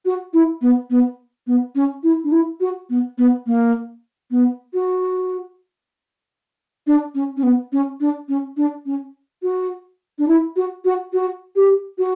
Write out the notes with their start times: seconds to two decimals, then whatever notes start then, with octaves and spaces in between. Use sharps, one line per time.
0.05 F#4
0.33 E4
0.61 B3
0.90 B3
1.47 B3
1.75 C#4
2.03 E4
2.24 D4
2.32 E4
2.60 F#4
2.89 B3
3.18 B3
3.46 A#3
4.31 B3
4.74 F#4
6.87 D4
7.15 C#4
7.37 C#4
7.43 B3
7.72 C#4
8.00 D4
8.28 C#4
8.57 D4
8.86 C#4
9.42 F#4
10.18 D4
10.28 E4
10.56 F#4
10.85 F#4
11.13 F#4
11.56 G4
11.98 F#4